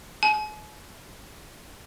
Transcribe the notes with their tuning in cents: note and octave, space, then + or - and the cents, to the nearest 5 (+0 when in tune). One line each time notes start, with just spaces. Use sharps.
G#5 +40